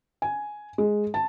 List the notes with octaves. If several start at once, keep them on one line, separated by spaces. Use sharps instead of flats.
G#5
G#3
A5